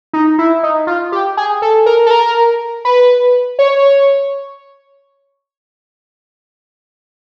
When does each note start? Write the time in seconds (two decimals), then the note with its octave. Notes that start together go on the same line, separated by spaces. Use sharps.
0.13 D#4
0.39 E4
0.63 D#4
0.87 F4
1.12 G4
1.37 G#4
1.62 A4
1.86 A#4
2.06 A4
2.11 A#4
2.85 B4
3.59 C#5